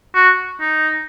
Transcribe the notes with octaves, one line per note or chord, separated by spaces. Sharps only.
F#4
D#4